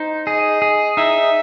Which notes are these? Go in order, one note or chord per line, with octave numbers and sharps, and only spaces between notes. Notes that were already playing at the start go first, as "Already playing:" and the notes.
Already playing: D#4 C5
G#4 D#5
G#4
D#4 E5